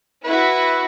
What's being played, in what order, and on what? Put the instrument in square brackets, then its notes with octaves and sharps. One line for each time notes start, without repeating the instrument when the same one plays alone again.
[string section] E4 F#4 [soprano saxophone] B4